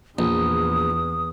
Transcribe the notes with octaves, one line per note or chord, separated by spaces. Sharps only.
A#1 E2 D#6